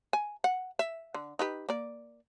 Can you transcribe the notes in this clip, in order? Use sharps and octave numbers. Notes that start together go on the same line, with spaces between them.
G#5
F#5
E5
D3
D#4 G4 B4
A#3 D5